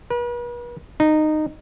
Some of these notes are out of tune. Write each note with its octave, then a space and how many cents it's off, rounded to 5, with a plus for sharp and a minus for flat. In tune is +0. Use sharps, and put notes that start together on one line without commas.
B4 -40
D#4 -15